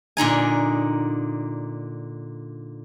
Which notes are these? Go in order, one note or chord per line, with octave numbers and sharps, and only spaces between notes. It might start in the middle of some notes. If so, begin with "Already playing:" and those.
A#2 D3 D#4 G#5